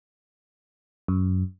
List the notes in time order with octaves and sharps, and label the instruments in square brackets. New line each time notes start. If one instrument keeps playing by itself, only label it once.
[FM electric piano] F#2